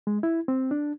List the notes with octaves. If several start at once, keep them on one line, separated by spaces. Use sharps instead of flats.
G#3
E4
C4
D4